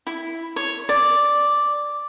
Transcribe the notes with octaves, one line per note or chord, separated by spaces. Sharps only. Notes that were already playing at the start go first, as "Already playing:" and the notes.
E4
C#5
D5